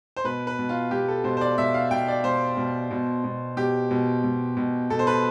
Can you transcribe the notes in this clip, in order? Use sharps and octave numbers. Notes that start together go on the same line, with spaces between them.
C5
B2 B4
B4
B2
F4
B2 G4
A4
B2 C5
C5
D5
B2 E5
F5
B2 G5
D5
B2 C5
B2
B2
B2
B2 G4
B2
B2
B2
B2 A4
C5
B4